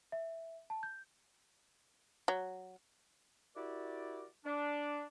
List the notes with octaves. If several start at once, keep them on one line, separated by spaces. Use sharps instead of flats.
E5
A5
G6
F#3
E4 F#4 G4 A#4 D5
D4